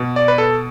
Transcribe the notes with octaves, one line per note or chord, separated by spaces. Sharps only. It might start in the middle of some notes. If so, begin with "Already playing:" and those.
Already playing: B2
D5
B4
A4